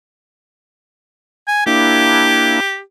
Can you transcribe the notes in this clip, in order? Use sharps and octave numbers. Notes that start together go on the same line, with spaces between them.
G#5
A#3 D4 E4 G4